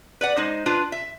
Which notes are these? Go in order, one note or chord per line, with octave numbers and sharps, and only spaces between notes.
B4 D5 F#5
G#3 D#4 C5
D4 F4 B4
E5